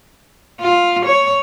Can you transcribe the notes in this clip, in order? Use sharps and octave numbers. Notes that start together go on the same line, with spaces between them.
F4
C#5